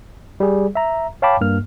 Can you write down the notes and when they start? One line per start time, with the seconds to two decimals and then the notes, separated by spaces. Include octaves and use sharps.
0.40 G3 G#4
0.75 E5 A#5
1.22 C#5 F5 G5 A5 B5 D6
1.41 G2 A#3 F6